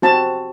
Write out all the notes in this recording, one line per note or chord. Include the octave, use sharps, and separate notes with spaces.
C4 F#4 A5